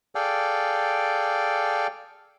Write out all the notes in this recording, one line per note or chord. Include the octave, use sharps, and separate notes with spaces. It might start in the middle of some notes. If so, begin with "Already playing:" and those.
G#4 A4 D5 F5 G5